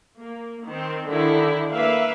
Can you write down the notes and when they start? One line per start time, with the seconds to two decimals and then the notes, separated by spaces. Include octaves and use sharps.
0.19 A#3
0.65 D#3 C4
1.07 D3 D#3 E4
1.71 A#3 B4 E5 F5